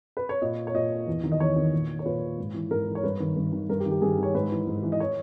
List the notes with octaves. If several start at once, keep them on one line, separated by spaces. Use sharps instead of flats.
B4
C#5
A#2 D#5
C#5
A#2 D#5
E2
D#3
D#5
E2 C#5
D#3
A#2
C#5
A#2 B4
G#2
E3
G#2 A#4
E3
C#5
G2 B4
D#3
G2
D#3
G2 A#4
G4
D#3
G4
G2 G#4
D#3 C#5
G#2 B4
E3
G#2
E3
D#5
C#5